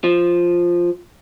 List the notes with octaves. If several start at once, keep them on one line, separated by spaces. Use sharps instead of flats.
F3